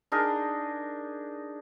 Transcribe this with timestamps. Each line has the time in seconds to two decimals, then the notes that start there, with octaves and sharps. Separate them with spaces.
0.12 D4 D#4 G#4 A#4